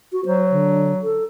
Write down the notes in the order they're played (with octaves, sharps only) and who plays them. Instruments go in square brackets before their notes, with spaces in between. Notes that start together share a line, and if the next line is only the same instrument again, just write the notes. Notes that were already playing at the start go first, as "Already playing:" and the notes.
[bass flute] F#4
[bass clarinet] F#3 [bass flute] C5
[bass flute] D3
A4